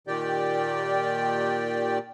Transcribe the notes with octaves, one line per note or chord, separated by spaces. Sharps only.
A#2 D#3 G4 D5 G5